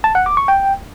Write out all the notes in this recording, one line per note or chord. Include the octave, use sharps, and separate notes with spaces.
A5
F#5
D6
C#6
G5